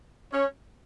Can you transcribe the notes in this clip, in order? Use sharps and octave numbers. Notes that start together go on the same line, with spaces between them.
C#4 C#5